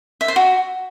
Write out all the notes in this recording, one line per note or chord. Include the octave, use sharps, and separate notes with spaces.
E5
C5
F#4